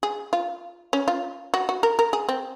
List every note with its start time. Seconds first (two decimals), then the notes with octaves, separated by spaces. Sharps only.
0.03 G#4
0.33 F4
0.93 C#4
1.08 F4
1.54 F#4
1.69 F#4
1.83 A#4
1.99 A#4
2.13 G#4
2.29 C4